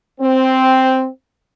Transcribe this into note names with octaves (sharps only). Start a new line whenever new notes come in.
C4